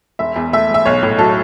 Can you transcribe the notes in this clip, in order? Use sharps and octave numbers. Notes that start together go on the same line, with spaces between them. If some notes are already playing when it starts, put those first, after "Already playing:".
E1 E5
E2
A3 E5
E1 E5
B1 C#5
A2
F#3 A4